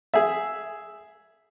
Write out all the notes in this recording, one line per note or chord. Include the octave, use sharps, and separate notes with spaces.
G#4 E5